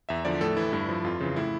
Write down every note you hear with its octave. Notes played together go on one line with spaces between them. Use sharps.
E2 E5
D3 F3 D5
A2 A4
E3 E4
G2 E4
F3
F2 F4
C#3 E3
A2 E4